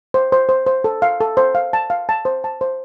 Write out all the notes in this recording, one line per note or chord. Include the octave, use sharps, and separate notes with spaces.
C5
C5
C5
C5
A4
F5
A4
C5
F5
A5
F5
A5
C5
A5
C5